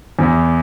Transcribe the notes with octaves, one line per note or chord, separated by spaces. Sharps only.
E2